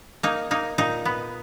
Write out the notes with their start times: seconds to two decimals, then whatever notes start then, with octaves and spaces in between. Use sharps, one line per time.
0.23 A#3 D#4
0.51 A#3 D#4
0.78 A#2 D#4
1.05 B3